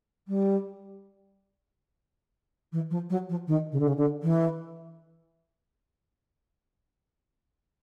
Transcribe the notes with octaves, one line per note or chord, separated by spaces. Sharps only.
G3
E3
F3
F#3
F3
D#3
C#3
D3
C#3
D3
E3